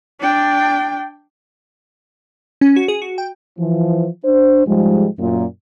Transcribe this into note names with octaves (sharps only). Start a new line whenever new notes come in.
D4 G5
C#4
F#4
G#4
F#4
G5
E3 F3
D4 C5
G#2 F3 G3 G#3
F#2 A#2